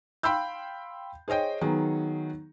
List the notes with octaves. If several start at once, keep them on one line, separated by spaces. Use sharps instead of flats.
F5 G5 B5 C6 E6 G6
G#4 C5 C#5 D#5 G5
D#3 F#3 B3 G#4